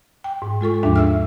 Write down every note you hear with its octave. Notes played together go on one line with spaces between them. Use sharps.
G5
G#2
G#3 F4 A4 C#6
D#2 G#2 F3 D4 E5
E5 E6 F6